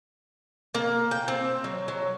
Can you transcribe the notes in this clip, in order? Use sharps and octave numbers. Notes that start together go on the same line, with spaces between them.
A#3
G5
C4
F#3
F#3